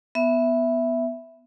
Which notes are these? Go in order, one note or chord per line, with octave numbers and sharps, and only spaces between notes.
B3 E5